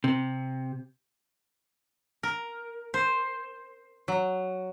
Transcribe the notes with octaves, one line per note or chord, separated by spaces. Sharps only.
C3
A#4
C5
F#3